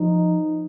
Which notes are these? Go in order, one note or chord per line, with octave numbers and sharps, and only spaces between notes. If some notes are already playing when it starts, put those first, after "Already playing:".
Already playing: F3 D#4